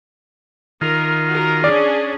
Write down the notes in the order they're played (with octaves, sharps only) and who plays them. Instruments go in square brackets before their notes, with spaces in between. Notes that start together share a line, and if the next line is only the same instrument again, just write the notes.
[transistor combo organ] D#3 F4 [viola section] A#4
[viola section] F#4 A#4
[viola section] C#4 D4 G#4 [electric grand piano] D5